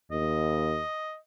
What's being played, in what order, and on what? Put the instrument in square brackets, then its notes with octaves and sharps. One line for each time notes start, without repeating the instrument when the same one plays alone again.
[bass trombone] D#2 [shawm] D#5